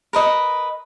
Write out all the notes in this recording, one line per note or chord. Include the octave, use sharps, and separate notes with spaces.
A#4 B4 D#5